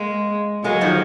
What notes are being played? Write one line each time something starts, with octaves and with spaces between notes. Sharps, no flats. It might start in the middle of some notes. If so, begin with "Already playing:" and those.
Already playing: G#3 A#3
F#3 G#3 A#3
D#3 F3